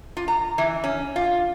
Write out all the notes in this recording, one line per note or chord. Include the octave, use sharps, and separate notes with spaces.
F4
A#5
E3
C#4
F4